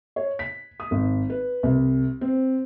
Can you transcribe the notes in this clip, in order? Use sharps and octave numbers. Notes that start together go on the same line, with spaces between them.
C#5
B6
D#6
G#1
B4
C2
C4